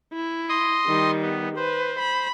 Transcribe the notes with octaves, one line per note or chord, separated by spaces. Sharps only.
E4
D#5 C6 D#6
D#3 G3
B3
B4 C5
B5